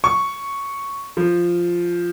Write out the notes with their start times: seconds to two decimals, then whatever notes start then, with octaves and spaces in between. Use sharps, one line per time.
0.04 C#6
1.17 F3